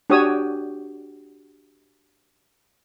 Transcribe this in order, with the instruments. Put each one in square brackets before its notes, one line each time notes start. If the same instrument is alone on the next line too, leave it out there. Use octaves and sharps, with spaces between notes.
[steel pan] D4 F#4 G4 C#5 D#6 E6